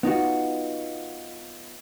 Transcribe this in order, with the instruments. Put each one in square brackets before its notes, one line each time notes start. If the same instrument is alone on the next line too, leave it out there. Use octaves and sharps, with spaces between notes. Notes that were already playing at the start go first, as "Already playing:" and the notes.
[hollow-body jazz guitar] B3 D#4 F4 F#4